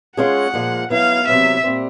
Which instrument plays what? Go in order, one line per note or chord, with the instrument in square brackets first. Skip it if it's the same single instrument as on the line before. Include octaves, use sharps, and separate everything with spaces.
[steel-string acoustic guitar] G#3 C#4 F4 G#4 [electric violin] F#5
[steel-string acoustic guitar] A#2 F3 G#3
[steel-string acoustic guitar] F#3 B3 E4 [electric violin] F5
[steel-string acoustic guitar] E2 C3 D#3 F#3 B3 [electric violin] E5
[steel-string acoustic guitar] A#2 G3 C4